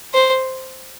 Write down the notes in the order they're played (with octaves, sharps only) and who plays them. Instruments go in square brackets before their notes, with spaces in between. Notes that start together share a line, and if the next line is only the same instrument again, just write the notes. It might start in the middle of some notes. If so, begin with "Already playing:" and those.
[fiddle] C5